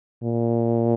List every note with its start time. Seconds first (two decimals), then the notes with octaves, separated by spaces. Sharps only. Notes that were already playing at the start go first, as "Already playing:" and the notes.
0.23 A#2